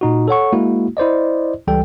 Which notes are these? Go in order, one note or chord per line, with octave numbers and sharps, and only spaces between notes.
A#2 D#4 F#4
A4 C#5 F#5 C#6
G#3 A#3 E4 F#4
E4 C5 D5 D#5
C#2 E3 G3 A4 G5